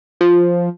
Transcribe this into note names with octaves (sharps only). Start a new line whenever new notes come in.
F3